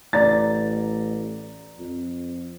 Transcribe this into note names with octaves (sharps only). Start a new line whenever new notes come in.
A1 D5 A#5 A6
F2